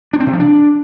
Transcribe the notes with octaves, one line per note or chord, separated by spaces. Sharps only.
D4
C4
C3
F3
D4